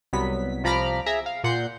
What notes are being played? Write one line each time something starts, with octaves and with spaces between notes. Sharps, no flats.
C2 F#3 B3 B6
C2 F3 A#5 B5 D6 F6
G#4 E5 A#5
F5
A#2 F#5 C6 G6 C7